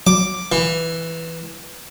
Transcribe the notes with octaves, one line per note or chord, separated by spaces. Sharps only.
F#3 D6
E3